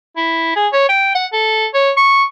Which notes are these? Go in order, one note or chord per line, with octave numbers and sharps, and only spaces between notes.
E4
G#4
C#5
G5
F#5
A4
C#5
C#6